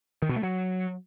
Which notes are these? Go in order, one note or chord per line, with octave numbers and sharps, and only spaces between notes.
D#3
B2
A3
F#3